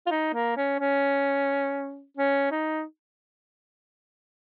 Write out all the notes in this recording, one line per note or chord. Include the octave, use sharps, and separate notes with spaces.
F4
D#4
A#3
C#4
C#4
C#4
D#4